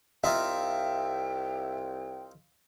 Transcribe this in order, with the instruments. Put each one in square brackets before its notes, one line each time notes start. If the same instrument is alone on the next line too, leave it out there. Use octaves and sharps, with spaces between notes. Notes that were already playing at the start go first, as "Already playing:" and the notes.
[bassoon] C2 [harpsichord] C4 D#4 F4 [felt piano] E5 [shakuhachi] G5